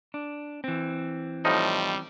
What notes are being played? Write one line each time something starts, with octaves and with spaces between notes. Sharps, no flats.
D4
E3 C4
A2 F3 G3 D#4